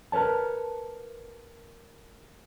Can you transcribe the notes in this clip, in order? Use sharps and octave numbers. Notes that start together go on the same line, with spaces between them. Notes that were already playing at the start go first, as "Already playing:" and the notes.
A#4 B4 C#5 A5